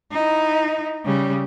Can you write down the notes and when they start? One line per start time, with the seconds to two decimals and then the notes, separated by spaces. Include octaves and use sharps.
0.12 D#4 E4
1.05 C#3 G3